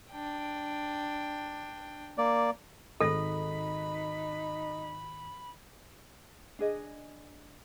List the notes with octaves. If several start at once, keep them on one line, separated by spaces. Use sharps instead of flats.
D4 G5
A#3 D5
G#1 D#4 G#4 A4 B5 A#6
D4 G#4 D#5